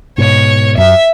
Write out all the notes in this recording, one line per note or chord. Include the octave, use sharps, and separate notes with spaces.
G#2 B2 C#5
F#2 E5